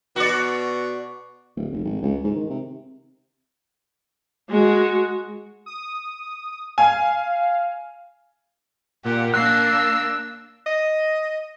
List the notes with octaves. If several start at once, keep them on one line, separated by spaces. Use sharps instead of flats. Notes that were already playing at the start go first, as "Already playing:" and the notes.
B2 F#4 D5
D1
F1
G#1
C#2
G#2
D#3
C3
G#3 F#4
D#6
F5 G#5
A#2 G4 F#5
A#3 D4 E6 F#6 C7
E6
D#5